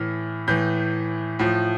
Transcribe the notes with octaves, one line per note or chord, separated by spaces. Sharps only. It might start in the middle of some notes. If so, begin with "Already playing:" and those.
Already playing: A2 E3 F6
A2 E3 G6
A2 F3